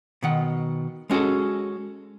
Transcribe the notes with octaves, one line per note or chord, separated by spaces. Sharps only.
B2 D#3 F#5
G#3 C#4 F#4 G#4 A4